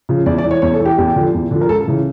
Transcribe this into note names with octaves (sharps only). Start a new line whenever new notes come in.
C#3 F3
E2 D5
D5
E3
C#5
E2 C#5
A4
E3
G4
E2 G4
D3 F3
E2
D3 F3
A#4
C#2 A4
C#3 E3